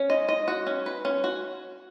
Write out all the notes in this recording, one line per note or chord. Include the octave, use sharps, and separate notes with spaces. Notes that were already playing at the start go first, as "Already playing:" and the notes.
Already playing: C#4
D#5
D#5
F#4
C#4
B4
C#4
F#4